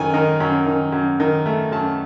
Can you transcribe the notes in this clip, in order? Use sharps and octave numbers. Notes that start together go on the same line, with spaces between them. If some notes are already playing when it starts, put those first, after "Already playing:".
Already playing: F#2 D#3 G#5
D#3
F#2
D#3
F#2
D#3
A3
F#2 A5